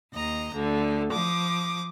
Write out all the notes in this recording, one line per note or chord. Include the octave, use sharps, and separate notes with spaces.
D#2 D#5 A#5
D2 D3
F3 D6 D#6